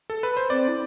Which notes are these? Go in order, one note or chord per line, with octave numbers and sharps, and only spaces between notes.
A4
B4
C5
C4 D5
E4